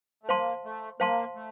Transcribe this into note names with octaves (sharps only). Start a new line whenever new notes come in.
A3
A#3 C5 F5 A5 C6
A3
A#3 C5 F5 A5 C6
A3